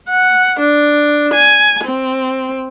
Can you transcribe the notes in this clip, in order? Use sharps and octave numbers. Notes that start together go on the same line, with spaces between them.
F#5
D4
G#5
C4